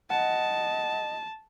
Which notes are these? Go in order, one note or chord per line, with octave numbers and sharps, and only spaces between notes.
D#5 F#5 A5